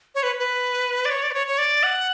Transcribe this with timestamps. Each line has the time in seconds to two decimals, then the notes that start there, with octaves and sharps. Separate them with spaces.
0.15 C#5
0.23 B4
0.39 B4
1.05 D5
1.11 C#5
1.23 D5
1.31 B4
1.34 C#5
1.47 C#5
1.58 D5
1.83 F#5